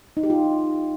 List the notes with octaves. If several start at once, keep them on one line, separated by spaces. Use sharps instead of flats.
D#4
G4
F4